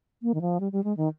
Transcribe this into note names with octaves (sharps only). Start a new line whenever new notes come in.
A#3
D#3
F3
G3
G3
G#3
D#3